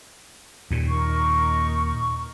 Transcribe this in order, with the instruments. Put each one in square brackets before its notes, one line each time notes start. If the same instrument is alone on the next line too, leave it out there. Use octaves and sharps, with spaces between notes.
[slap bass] D#2 A#2
[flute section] D#4 A#4 C#6